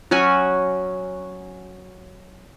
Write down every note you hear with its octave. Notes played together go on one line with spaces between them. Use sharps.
F#3 C#4 F#4 G#5